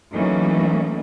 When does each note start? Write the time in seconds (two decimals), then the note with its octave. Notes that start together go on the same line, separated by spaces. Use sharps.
0.13 E3 F#3 A3 A#3 C#4 D#4